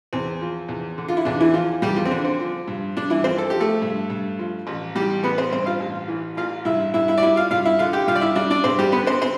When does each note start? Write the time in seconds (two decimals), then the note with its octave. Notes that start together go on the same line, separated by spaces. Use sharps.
0.13 E2 C4
0.41 F3
0.68 E2
0.98 D3
1.08 F4
1.17 E4
1.25 E2 D4
1.41 E3 E4
1.54 F3 F4
1.82 E2 G3 G4
1.96 F3 F4
2.05 C4
2.11 D3 D4
2.25 C4
2.40 F3
2.68 G2
2.97 G2 D4
3.10 E3 E4
3.24 F3 C4 C5
3.38 A4
3.50 F3 G4
3.60 A3 A4
3.82 G2
4.10 G2
4.39 F3
4.67 A1
4.95 E3 G3 G4
5.23 A1 B3 B4
5.38 C4 C5
5.52 G2 C4 C5
5.66 F4 F5
5.80 A1
6.08 E3
6.37 A1 F4 F5
6.65 G2 E4 E5
6.94 G2 E4 E5
7.08 E4 E5
7.18 D5
7.22 G3 E4 E5
7.36 F4 F5
7.51 G2 F4 F5
7.65 E4 E5
7.79 D3 F4 F5
7.93 G4 G5
8.07 G2 F4 F5
8.15 D5
8.21 E4 E5
8.36 G3 D4 D5
8.50 D4 D5
8.64 G2 C4 C5
8.79 G3 G4
8.92 D3 B3 B4
9.07 C4 C5
9.21 C4 C5